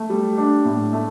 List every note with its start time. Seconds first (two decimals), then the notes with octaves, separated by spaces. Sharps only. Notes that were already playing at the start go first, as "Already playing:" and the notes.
Already playing: A3
0.10 G3
0.38 D4
0.65 A2
0.93 A3